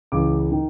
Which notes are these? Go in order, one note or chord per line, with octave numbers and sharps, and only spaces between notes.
C#2 C#3 E3 D6
D#3